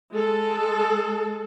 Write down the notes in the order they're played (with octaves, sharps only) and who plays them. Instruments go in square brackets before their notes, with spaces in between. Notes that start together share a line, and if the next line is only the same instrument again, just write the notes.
[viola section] G#3 A4